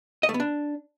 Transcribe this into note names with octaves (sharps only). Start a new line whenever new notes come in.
D#5
A3
B3
D4